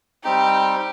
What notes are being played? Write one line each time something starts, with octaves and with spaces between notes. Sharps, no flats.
G3 C4 D#4 G4